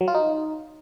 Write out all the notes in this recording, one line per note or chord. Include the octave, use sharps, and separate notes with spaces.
F#3
F4
D#4